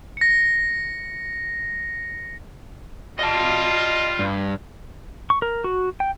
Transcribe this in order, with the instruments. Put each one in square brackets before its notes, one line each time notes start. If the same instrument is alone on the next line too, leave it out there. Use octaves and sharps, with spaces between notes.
[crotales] A#6 C#7
[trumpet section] G3 F4 [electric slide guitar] D#5 A5
[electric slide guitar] G2
[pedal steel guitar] C#6
A#4
F#4
G5